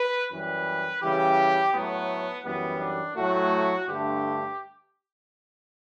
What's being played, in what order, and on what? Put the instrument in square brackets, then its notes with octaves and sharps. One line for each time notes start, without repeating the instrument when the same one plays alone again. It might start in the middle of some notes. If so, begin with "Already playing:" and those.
Already playing: [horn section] B4
F#2 E3 G3 B4
C#3 E3 G3 G4
A2 F#3 A3 B3
F#2 E3 G3 B3
D4
A2 F#3 A3 F#4
G2 D3 A3 G4